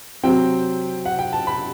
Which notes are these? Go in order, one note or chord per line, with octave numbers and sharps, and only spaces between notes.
C3 F#3 C4 G5
F#5
G5
A5
B5